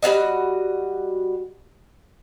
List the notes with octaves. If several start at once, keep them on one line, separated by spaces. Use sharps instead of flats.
G3 F4 F#4 D#5